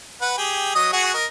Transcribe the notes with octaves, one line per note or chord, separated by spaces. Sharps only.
B4 F#5
G4 G#4 G5
F#3 D#5 D#6
F#4 G#4 F#5
A#4 D#5